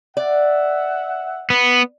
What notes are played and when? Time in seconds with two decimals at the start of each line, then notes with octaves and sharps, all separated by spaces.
0.17 D5 E5 F#5
1.50 B3